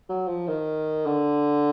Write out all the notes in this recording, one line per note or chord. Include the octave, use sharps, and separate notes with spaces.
F#3
F3
D#3
D3